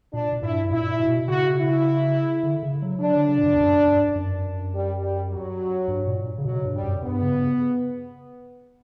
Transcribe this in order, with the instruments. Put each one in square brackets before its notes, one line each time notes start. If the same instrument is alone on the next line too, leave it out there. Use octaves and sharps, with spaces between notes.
[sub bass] A#2 [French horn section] D4
[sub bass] A#2
[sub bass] G2 [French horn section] E4
[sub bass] G2
[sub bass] A#2 [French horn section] E4
[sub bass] B2
[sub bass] C#3 [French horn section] F#4
[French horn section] E4
[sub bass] D3
C#3
F#3
[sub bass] F#3 [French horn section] D4
[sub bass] D3
C#3
A#2
G2
E2
F#2
G2
G2
F#2
[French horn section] G3
G3
F#3
[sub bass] G2
A#2
C#3
[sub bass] B2 [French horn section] F#3
[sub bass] G2
[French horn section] G3
[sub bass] F#2
[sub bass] G2 [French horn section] B3
[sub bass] C#3